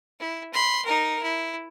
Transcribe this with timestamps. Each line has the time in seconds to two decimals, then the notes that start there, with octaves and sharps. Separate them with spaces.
0.20 E4
0.53 B5 C6
0.85 D#4 A#4
1.23 E4